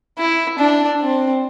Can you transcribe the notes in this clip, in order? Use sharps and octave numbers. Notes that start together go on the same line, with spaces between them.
E4
D4
C4